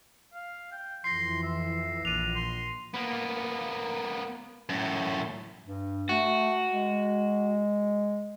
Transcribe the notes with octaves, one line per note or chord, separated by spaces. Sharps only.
F5
G5
F2 E3 C6 A#6 C7
E5
A#1 D4 D#7 F7
C6
A#3 B3
F#2 A2
G2
A3 F#4
G#3